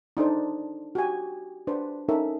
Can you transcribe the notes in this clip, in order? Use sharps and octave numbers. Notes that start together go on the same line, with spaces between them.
D4 D#4 A4 C5
F#4 G4 G#5
D4 B4 C5
C#4 D#4 A4 A#4 E5